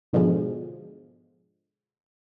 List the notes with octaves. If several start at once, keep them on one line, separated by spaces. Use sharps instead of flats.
G#2 B2 D3 F3 G#3